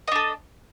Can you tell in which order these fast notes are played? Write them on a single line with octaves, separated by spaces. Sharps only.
D#5 D4 A4